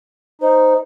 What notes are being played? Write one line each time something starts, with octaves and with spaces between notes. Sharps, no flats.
D#4 C5